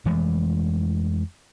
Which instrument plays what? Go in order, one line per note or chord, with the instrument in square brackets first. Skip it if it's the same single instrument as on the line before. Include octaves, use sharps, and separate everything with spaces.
[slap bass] F2 E3 G#3 A3